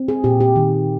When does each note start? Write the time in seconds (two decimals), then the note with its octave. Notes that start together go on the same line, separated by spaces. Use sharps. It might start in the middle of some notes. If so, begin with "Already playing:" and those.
Already playing: C4
0.08 G#4
0.24 A#2 G4
0.40 G4
0.56 D#3